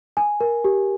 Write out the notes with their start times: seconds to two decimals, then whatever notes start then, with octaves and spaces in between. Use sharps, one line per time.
0.17 G#5
0.40 A#4
0.64 G4